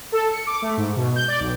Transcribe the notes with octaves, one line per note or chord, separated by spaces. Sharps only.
A4
C#7
D6
A3
G#2
B2
G6
D5
B1